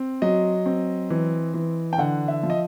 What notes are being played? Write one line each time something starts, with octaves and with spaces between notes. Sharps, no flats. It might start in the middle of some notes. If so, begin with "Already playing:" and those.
Already playing: C4
F#3 D#5
C4
E3
E3
G5
D3 F#5
E5
F3
D#5